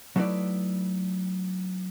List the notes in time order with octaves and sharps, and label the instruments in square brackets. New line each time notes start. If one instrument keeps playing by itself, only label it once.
[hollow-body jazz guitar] F#3 A3 D#4 E4 B4 D5